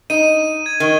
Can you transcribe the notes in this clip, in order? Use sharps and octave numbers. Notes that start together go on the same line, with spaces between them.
D#4 D#7
G#6
D#3